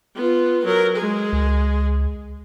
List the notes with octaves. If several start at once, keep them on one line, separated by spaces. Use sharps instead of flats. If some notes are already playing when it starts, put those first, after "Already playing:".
B3 F4
F#3 A#4
G#3 G#4
C#2